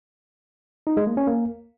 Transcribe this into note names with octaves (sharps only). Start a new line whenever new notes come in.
D#4
G#3
A#3
C#4
A#3